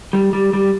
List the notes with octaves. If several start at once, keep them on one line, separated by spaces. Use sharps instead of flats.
G3
G3
G3